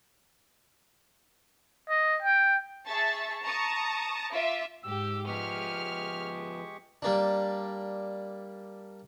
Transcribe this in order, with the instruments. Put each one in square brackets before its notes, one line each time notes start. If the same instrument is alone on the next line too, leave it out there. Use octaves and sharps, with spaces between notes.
[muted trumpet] D#5
G5
[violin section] G#4 E5 A5 C#6 A6
A5 A#5 C#6 D#6
F4 E5 D6
[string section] G#2 G4 [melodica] E6
[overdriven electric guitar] F3 B3 [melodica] G#3 G4 C#6 [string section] F6
[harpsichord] G3 A#3 D4